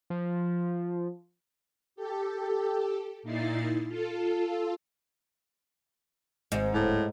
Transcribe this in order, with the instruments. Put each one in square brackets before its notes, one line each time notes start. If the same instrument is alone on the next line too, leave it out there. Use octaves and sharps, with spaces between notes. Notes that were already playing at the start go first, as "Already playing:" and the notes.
[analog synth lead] F3
[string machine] G4 A4
A#2 D#4 E4 A6 C7
F4 A4
[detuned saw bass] G#1 [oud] G#2
[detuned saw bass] D1 [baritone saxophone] A2